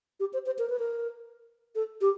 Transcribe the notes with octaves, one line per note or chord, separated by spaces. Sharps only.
G4
C5
C5
A#4
B4
A#4
A4
G4